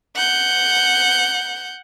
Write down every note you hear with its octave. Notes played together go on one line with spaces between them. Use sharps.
F#5 G6